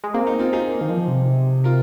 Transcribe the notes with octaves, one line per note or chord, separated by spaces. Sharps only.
G#3
A#3 C4
D#4
C4 F4
D#4 G#4
D#3
F3
C3
F4 A#4